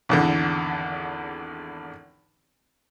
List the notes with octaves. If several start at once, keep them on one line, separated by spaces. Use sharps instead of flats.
G#1 E2 D3